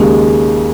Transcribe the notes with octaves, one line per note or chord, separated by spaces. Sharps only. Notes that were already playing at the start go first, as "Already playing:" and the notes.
Already playing: D#2 C#3 G#3